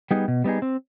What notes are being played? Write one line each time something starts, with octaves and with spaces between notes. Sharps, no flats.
G3 B3 D#4 G#4
B2
G3 B3 D#4 G#4
C4